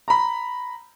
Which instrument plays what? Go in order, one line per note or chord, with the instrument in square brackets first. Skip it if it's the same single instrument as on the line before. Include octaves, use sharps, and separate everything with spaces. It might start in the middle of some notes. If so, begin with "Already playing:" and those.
[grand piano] A#5 B5